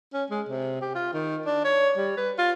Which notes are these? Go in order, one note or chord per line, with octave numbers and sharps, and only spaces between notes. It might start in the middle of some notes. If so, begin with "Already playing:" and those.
C#4
G#3
C3
G4
F4
D#3
D4
C#5
G3
B4
F4